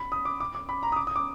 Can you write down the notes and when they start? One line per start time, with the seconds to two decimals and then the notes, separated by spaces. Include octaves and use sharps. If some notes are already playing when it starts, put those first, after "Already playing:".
Already playing: B5
0.12 D#6
0.25 D6
0.40 D6
0.55 D6
0.69 B5
0.83 A#5
0.92 D#6
0.96 D6
1.07 D#6
1.16 D6